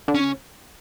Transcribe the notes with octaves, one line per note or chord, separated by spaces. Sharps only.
D3
C#4
C#3